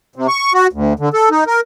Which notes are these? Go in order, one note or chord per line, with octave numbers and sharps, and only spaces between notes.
C3
C#6
F#4
D2
D3
A4
D#4
A#4